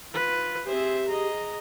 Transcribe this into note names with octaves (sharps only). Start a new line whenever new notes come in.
F4 B4
C4 G4 G#4 C5 E5
G#4 D#5 A#5